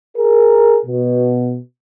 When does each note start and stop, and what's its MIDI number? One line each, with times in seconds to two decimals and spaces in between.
0.17 0.79 68
0.17 0.79 70
0.85 1.58 47